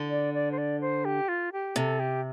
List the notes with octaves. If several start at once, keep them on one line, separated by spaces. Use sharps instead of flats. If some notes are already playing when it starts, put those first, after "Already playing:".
Already playing: D3
D5
D5
C5
D5
C5
G4
F4
G4
C3 A4
G4